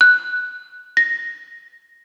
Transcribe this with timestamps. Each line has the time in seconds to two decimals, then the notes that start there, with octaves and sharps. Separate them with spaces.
0.01 F#6
0.97 A#6